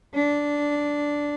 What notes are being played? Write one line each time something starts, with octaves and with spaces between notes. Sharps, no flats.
D4